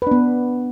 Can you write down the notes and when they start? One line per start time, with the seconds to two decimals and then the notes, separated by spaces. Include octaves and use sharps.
0.02 B4
0.07 D4
0.11 B3